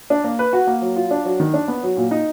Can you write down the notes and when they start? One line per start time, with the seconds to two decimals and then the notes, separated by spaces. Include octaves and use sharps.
0.10 D4
0.24 A#3
0.39 B4
0.53 F#4
0.67 A#3
0.82 F#3
0.97 F4
1.11 D4
1.25 F#3
1.40 D#3
1.54 D4
1.68 B3
1.83 F#3
1.97 A#2
2.11 D#4